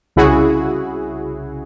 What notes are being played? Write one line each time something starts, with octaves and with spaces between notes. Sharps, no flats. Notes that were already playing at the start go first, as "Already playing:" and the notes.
C2 C#3 E4 F#4 G#4